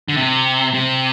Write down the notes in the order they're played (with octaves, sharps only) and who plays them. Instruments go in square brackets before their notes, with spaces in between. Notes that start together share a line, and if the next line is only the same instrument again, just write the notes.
[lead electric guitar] D3
C3
C3